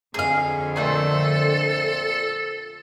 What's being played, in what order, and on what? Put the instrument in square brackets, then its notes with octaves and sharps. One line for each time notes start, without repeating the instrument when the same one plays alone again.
[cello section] F2 D3 [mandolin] G#4 F5
[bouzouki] A#2 A3 C4 [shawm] A4